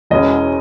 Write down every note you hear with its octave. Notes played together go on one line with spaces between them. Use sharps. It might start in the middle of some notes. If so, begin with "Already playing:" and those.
E1 E2 B2 G#3 C#4 D#5